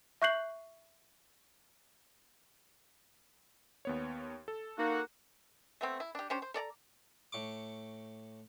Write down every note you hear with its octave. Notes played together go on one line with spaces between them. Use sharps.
E5 C#6 F#6 G6 C7 F#7
D#2 B3 C#5
A4
A#3 D#4 F#4
A3 B3 C4
E4
D4 G4
C#4 D4 G4 C5
C5
A4 D5 A5 A#5
A2 C#6 D6